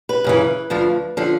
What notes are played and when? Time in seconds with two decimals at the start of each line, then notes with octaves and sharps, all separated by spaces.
0.09 B4
0.24 F#2 C#3 E3
0.70 D2 D3 F3
1.17 D3 F3